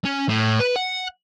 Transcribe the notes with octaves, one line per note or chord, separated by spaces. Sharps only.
C#4
A2
B4
F#5